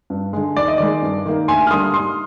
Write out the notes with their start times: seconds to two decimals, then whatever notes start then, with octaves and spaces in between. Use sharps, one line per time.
0.10 G2
0.33 D3 G#3
0.57 D#2 D5
0.68 D#5
0.78 D#3 G#3 D5
1.02 G2
1.26 D#3 A#3
1.48 D2 G#5 C6
1.67 F6
1.70 D3 G3 A#3 C6 D#6
1.93 G#2 C6 D#6